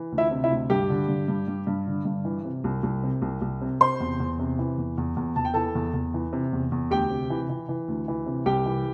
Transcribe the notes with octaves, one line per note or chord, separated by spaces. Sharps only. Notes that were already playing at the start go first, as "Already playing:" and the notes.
Already playing: E3
D2
E4 E5
C3
E4 E5
D2
G2 G4 G5
D3
G2
G2
G2
G2
D3
G2
E3
C3
C2
C2
C3
C2
C2
C3
C3 C5 C6
E2
E2
C3
E3
E2
E2
E2
E2 A5
G5
E3 A4 A5
E2
E2
E3
C3
E2
E2
D2 G4 G5
C3
E3
E3
E3
D2
E3
C3
C2 G4 G5
E3